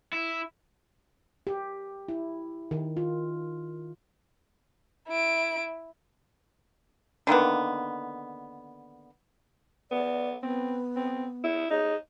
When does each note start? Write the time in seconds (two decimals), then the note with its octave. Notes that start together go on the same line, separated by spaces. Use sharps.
0.13 E4
1.47 G4
2.08 E4
2.71 D#3
2.97 F4
5.08 E4 D7
7.27 D3 D#3 A#3 B3
9.91 B3 D5
10.42 B3 C4
10.96 C4
11.44 E4
11.70 D#4 G#4